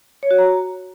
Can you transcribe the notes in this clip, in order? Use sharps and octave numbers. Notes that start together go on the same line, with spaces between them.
C#5
F#4
A#5